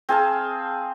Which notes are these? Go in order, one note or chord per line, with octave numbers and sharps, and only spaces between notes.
C4 G#4 F5 A5